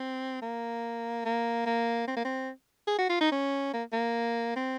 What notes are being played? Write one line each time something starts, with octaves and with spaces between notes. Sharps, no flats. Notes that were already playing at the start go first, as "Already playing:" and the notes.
Already playing: C4
A#3
A#3
A#3
C4
A#3
C4
G#4
F#4
F4
D#4
C#4
A#3
A#3
C4